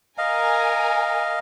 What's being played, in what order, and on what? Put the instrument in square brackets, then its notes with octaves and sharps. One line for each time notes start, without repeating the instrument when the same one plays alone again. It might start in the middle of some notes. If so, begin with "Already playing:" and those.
[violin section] A#4 G#5 [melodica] D#5 F5